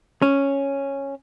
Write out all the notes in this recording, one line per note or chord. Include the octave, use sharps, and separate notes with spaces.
C#4